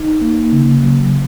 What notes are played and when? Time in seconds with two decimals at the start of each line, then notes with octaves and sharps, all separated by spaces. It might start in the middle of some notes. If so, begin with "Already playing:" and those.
Already playing: D#4
0.21 A#3
0.53 C#3
0.84 F#3